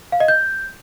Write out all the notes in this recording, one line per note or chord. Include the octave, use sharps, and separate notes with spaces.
F5
D#5
G6